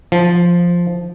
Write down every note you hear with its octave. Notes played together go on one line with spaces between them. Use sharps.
F3